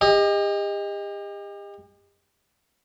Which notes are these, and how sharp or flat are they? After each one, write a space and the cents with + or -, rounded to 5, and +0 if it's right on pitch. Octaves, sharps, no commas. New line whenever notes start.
G4 +40 D#5 +0